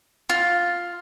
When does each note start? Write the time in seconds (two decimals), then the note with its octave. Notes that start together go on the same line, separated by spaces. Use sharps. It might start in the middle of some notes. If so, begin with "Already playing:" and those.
0.29 F4